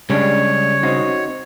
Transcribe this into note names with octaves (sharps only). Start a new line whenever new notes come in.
C#3 G3 G#3 D4 C#5
C4 D#4 F#4